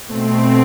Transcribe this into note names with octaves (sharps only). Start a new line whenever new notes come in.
B2 A3 C4